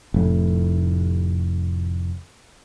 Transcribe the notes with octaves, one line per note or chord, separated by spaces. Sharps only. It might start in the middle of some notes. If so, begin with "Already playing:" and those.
F1 A2